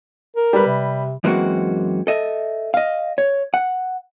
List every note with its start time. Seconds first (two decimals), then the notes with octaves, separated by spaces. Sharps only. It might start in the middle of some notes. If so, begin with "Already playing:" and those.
0.36 A#4
0.53 G3 B4
0.67 C3
1.24 F#2 E3 G#3 A#3 C4 F#4
2.07 A4 D#5 E5
2.74 D#5 F5
3.18 C#5
3.54 F#5